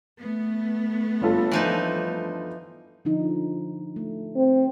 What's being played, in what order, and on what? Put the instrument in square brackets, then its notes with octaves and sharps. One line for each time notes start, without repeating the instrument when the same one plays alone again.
[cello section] A3 B3
[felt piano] G1 F4 A4
[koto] E3 F3 D#4
[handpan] D3 F3 D#4
A3
[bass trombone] C4